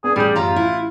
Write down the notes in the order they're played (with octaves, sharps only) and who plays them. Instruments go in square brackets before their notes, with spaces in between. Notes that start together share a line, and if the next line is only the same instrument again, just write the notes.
[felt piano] B3 D4 [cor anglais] G#4
[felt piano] A1 G6 [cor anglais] G3 [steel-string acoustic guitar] D4 G#4
[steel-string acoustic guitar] F#2 G4 A#5 [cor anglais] F4
[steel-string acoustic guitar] E4